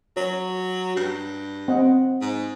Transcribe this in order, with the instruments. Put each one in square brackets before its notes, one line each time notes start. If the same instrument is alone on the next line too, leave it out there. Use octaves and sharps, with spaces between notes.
[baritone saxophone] F#3 [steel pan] C#5
[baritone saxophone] G2
[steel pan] C4 D#5 F#5
[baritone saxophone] G#2